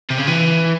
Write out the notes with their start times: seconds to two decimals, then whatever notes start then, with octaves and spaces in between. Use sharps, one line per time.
0.10 C3
0.18 C#3
0.27 E3